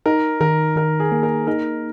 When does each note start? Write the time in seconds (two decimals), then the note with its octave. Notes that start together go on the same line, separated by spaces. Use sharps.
0.06 D#4 A#4
0.41 D#3 A#4
0.76 D#3 A#4
1.00 G#4
1.12 A#3
1.23 A#4
1.47 D#4 A#4